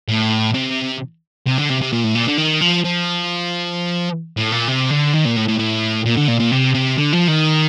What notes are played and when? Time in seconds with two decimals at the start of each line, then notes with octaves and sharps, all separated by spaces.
0.08 A2
0.54 C3
1.47 C3
1.58 D3
1.69 C3
1.81 C3
1.92 A#2
2.04 A2
2.15 A#2
2.27 D3
2.38 D#3
2.61 F3
2.84 F3
4.37 A2
4.52 A#2
4.68 C3
4.91 D3
5.13 D#3
5.25 A#2
5.36 A2
5.48 A2
5.59 A2
6.06 A#2
6.17 D3
6.28 A#2
6.40 A#2
6.51 C3
6.74 C3
6.97 D3
7.12 F3
7.27 D#3